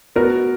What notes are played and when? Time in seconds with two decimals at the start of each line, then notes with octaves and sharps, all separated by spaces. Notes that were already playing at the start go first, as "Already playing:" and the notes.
0.16 B3 F#4 A#4